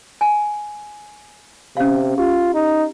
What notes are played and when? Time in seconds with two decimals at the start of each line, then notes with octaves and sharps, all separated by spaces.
0.21 G#5
1.77 C3 C#4 F5
2.18 F4 G4
2.55 D#4